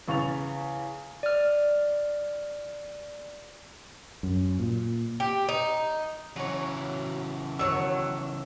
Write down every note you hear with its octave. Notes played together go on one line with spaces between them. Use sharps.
E2 C#3 C#6 A6 F7
D5 F6
F#2
A#2
G4
D#4
C#3 E3 F#3 C#5
D#3 F#3 C#5 E6